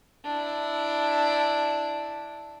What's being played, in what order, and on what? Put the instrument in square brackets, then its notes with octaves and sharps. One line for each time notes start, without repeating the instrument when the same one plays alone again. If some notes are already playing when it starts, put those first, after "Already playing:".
[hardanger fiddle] D4 E4